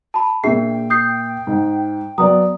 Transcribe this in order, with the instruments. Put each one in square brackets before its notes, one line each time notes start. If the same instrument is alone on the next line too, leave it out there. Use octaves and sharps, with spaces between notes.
[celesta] A5 B5
[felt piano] A#2 E5 [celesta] D4 G#4 C7 [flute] G5
[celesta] D#6 G6 C7
[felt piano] G#2
[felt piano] F#3 B3 D5 [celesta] A#5 D#6